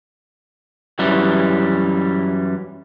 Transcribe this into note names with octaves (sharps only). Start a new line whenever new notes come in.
F#2 E3 G3